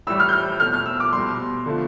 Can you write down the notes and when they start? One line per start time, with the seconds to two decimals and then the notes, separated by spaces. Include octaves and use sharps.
0.07 A2 E3 G3 E6
0.20 F6
0.29 G6
0.33 F6
0.60 B2 A3 F6
0.74 F6
0.86 E6
1.00 D6
1.13 B2 G3 C6
1.66 D3 F3 A3